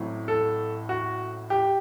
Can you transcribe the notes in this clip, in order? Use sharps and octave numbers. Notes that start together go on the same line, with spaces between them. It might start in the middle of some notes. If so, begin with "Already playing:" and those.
Already playing: A1 A2 F#3 C4
A4
F#4
G4